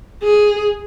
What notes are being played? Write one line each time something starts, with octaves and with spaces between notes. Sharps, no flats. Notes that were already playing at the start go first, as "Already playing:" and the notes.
G#4